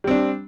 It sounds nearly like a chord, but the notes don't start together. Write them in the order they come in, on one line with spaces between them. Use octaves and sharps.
G3 C4 D4